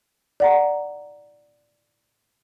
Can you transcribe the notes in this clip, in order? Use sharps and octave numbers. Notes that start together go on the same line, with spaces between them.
D5 F#5 A#5